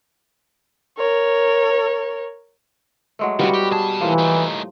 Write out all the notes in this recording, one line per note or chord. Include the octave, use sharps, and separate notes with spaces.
A#4 C#5
F#3 G#3 A3
C#3 G3 B3 F#4
G4
B2 G#4 A5
A2 E3 F3 A#3
A3 D#4